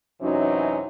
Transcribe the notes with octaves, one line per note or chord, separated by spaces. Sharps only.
F#2 C3 E3 F#3 C#4 D#4